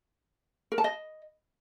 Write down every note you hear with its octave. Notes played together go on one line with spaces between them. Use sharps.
A#4
A5
D#5